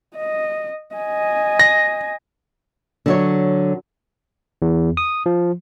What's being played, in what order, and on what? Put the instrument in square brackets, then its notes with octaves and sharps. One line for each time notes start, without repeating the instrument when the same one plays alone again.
[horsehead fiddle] D#5
D#5 G#5
[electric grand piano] A#6
[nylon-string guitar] D3 F#3 C#5
[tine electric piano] E2
D#6
F3